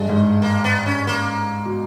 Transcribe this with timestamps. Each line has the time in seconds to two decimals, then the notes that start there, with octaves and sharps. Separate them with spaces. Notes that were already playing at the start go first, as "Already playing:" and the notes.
Already playing: G2 G#3
0.09 G#2
0.42 A#3
0.64 B3
0.86 C#4
1.07 A#3
1.65 B2